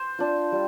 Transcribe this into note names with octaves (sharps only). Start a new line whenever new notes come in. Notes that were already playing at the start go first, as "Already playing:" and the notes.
Already playing: C5
D4 F4
G3